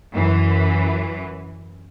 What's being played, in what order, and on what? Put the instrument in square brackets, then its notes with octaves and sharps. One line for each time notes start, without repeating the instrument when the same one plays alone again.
[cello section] F#2 E3